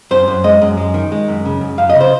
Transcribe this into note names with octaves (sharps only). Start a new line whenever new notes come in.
F#2 C5
F#2
G#3 D#5
F#2
G#3
D#3
G#3
F#2
C#3
F#2
F#2 F5
D#5
C#3
C5